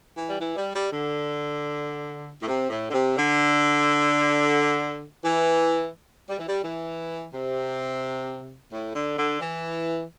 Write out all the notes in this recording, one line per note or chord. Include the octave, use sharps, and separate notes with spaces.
E3
G3
E3
G3
G3
D3
A2
C3
A2
D3
C3
D3
E3
G3
E3
G3
E3
C3
A2
D3
D3
E3